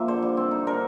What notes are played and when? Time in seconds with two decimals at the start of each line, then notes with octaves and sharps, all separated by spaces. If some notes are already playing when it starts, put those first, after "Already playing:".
Already playing: F3 A#3 E5
0.08 D3 C5
0.22 G3
0.37 C4
0.51 D#4
0.67 D3 A#4